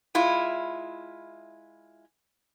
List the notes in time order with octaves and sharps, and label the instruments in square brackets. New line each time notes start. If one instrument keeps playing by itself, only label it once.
[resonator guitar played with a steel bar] G#3 E4 F4